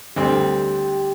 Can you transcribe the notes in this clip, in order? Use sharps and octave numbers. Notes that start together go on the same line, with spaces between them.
D2 D3 G3 C4 G4